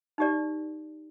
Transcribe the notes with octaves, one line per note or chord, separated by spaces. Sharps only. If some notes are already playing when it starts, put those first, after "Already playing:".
D#4 G4 D5